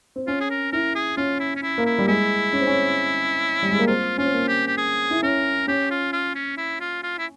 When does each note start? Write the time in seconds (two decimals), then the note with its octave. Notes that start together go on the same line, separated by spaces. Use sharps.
0.16 C4
0.27 C#4 F4
0.41 G#4
0.50 A#4
0.72 E4 A#4
0.95 G#4
1.17 C#4 F4
1.40 E4
1.56 C#4
1.62 E4
1.78 A#3
1.86 E4
1.99 G3
2.08 G#3 E4
2.53 C#4
2.60 C4
2.67 C#4
3.63 G3
3.71 G#3
3.79 A#3
3.87 C4 F4
4.18 C#4 F4
4.25 C4
4.33 A#3
4.48 G4
4.67 G4
4.78 G#4
5.11 E4
5.23 C#4 A#4
5.68 C#4 G4
5.91 F4
6.13 F4
6.35 C#4
6.57 E4
6.80 F4
7.03 F4
7.18 E4